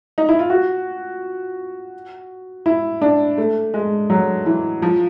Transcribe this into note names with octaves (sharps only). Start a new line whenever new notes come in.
D#4
E4
F4
F#4
E4
D4
A3
G#3
F#3
E3
F3